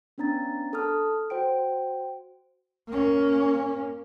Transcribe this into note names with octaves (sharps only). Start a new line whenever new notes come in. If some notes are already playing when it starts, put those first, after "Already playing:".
B3 C#4 D4 A#5 A6
A4 A5 D#6 F6
F#4 C5 G5 D7
A#3 C#4